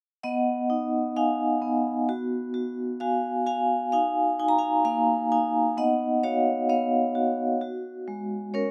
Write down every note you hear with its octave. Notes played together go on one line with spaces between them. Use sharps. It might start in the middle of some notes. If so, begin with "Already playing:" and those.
B3 D#5 F#5
D#4
D#4 F5 G#5
B3
F#4
F#4
F#4 F5 G#5
F#4 F5 G#5
D#4 F5 G#5
D#4 G#5
A#5
F5 G#5
A#3 F5 G#5
D#4 F5 G#5
B3 D#5 F#5
F#4 C#5 F5
B3 C#5 F5
F#4
F#4
G#3
C#4 A#4 C#5